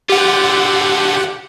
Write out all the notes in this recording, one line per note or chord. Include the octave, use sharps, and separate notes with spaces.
D3 F4 G4 F#5